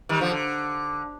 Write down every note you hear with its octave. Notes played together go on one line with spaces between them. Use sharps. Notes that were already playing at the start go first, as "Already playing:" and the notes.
D#3 G3
D3 F3
D3